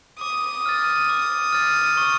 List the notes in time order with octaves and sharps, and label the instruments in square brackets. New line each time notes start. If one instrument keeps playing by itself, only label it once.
[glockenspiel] D6 [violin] D#6
[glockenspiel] F6 A6
D6
F6 A6
C#6